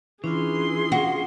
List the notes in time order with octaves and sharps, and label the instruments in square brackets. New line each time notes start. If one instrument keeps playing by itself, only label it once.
[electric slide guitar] E3 [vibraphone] C#4 D4 F4 [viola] G#4 C6
[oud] F#4